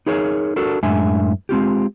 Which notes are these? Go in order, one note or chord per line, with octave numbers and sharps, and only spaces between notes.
D#4 G#4 A#4 C#5
D4 F#4 A4 A#4
F#2 A2 G#3 D4 E5 G#5
G#3 C4 F4 G4